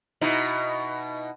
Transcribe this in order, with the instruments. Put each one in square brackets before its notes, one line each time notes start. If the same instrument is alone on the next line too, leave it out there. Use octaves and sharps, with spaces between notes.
[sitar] B2 D#4 E4